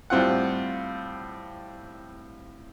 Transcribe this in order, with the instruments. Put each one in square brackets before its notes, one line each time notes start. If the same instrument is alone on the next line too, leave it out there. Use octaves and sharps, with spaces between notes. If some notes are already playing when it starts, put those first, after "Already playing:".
[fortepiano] A2 G3 C4 F4 F#5